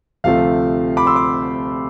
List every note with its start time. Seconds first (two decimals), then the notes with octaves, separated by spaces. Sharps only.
0.24 D2 C3 F3 A3 F5
0.97 B5 D6
1.07 C6 E6
1.16 D6